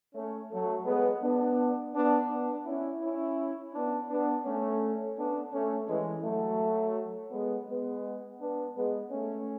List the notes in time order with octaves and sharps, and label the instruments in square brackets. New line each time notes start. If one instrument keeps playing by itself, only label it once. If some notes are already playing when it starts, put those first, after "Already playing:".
[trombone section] A3 C#4
F#3 A3
G#3 B3
B3 D4
B3 D4
B3 D4
C#4 E4
C#4 E4
B3 D4
B3 D4
A3 C#4
B3 D4
A3 C#4
E3 G#3
F#3 A3
G#3 B3
G#3 B3
B3 D4
G#3 B3
A3 C#4